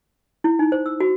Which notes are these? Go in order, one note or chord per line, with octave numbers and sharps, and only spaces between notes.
E4
D#4
C5
E6
F#4